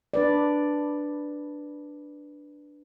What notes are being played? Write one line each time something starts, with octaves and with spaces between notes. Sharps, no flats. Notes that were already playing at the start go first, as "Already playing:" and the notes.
D4 B4 D5